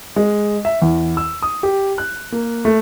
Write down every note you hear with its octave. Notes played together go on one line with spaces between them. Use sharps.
G#3
E5
E2
E6
D#6
G4
F#6
A#3
A3